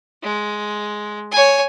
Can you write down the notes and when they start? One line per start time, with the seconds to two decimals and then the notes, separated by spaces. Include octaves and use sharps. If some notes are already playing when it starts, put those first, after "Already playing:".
0.23 G#3
1.31 C#5 G#5